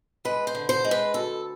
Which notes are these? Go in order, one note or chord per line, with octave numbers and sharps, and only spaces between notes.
G#3 B4
C5
D3
C5
G#3
B4
D2 A4